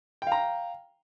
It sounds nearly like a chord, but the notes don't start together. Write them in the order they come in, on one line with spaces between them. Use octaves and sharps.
G5 F5 A#5